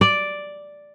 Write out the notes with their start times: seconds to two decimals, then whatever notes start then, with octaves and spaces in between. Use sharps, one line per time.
0.01 D5